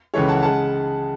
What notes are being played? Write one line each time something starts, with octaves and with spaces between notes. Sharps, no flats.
C#2 C#3 E3 G#3 A4 C#5
F#5 A5
C#3 G#3 F#5 A5